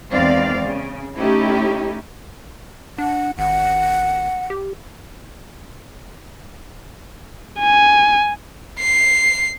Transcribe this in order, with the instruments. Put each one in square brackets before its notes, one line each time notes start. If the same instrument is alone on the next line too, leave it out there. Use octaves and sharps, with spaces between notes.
[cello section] E2 D#3 G#3 C4 D5 F5
C#3
A3 C#4 D#4 E4 G4
[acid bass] D4 [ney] F#5
[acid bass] G#1 [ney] F#5
[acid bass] G4
[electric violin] G#5
[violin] C7